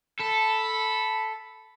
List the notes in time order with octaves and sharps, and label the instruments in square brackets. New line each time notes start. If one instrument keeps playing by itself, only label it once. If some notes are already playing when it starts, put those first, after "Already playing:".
[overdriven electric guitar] A4 [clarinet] B5